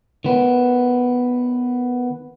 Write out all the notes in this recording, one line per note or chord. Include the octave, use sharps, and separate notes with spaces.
D#3 B3